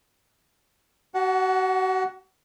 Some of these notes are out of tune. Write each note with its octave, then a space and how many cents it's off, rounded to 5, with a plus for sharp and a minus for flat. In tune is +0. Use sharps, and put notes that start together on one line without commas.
F#4 +35 F#5 +0 A5 -20